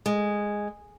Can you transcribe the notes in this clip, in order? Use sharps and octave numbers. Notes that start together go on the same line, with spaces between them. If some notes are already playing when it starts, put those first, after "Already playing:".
G#3